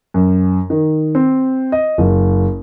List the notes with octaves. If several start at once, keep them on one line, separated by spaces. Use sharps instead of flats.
F#2
D#3
C4
D#5
F#1